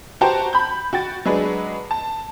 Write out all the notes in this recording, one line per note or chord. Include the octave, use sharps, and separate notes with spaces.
F#4 G4 C5 G5 A5 A#5
B5 G6
F#4 G5 A6
F#3 G#3 D4 G#4 B4
A5